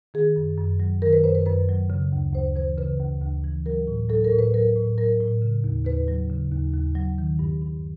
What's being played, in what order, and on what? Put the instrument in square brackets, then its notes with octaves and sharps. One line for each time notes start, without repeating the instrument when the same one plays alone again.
[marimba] D#3 G#4
F#2
F#2
F#3
D#3 A#4
B4
F#2 C5
B4
F#2 B4
F#3
C#3
D2
D2 C5
E3 C5
C#3 B4
D2
D2
E3
F#3 A#4
A2
F#3 A4
A#4
A2
B4
F#3 A#4
A2
F#3 A#4
A2
C#3
D#2
D#2 B4
F#3
C#3
D#2
D#2
F#3
D#3
G2
G2